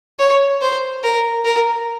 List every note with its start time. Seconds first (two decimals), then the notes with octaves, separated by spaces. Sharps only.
0.19 C#5
0.61 C5
1.03 A#4
1.45 A#4